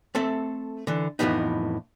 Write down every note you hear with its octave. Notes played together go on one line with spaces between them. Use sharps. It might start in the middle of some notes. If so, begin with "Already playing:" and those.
A3 C4 A4 E5
D3 E3
F2 A2 D#3 E3 B3 D#4